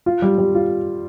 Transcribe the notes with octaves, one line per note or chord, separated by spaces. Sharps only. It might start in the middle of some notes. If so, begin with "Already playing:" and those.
F4
G3
G3
F4